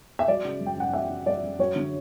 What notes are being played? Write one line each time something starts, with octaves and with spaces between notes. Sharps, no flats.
E5
F#3 D5
C#3
F#2
G5
F#2 F#5
F#3 E5
C#3
F#2 D5
F#2
F#3 C#5
D3